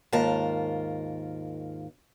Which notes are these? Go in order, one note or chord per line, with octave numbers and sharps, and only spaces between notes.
D#2 G#2 F4 A#4 A5